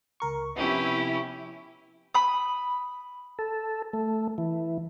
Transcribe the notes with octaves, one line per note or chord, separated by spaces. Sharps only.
C#2 A#4 C#6
C3 F3 B3 C#4 E4 G4
B5 D#6
A4
A3
E3